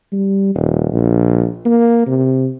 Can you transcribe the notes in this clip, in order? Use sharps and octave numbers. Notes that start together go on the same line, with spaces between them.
G3
D#1
A#1
A#3
C3